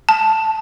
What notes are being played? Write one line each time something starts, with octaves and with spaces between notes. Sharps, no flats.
A5